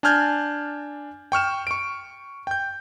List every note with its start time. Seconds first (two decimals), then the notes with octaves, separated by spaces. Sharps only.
0.03 D4 G#5 A5 F6 G6 G#6
1.32 G5 C#6 F6 E7
1.67 C#6 D7
2.47 G5 G6